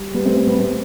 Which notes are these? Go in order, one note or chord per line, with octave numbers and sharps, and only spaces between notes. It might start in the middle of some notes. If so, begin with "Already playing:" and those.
Already playing: G3
G3 B3
A3 C4
A3 C4
G3 B3
A3 C4